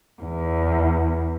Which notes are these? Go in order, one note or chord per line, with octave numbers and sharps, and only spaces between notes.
E2